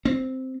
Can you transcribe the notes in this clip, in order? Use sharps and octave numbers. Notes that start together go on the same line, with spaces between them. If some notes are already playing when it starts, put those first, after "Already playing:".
C4